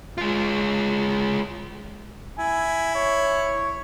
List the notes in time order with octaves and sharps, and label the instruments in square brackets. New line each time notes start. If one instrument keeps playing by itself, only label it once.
[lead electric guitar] G#3 F4
[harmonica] E4 [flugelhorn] G#5
[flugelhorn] C#5